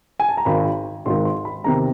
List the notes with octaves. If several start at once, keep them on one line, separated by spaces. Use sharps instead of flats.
G#5
A5
A#5
G#1 G#2 D#3 B5
G#1 G#2 D#3 C6
C6
B5
E2 C3 D#3 A#5